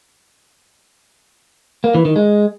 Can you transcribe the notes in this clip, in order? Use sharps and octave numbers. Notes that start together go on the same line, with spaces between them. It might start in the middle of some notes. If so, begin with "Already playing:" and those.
A#3
E3
D#3
G#3